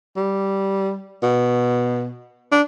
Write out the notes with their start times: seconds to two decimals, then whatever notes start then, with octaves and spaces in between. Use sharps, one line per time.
0.17 G3
1.23 B2
2.52 D4